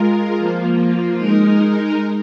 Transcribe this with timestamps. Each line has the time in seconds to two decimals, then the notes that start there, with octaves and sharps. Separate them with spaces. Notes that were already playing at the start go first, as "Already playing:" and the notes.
Already playing: G#3 F4 A#4
0.39 F3 A#3 F4
1.18 G#3 D#4 A#4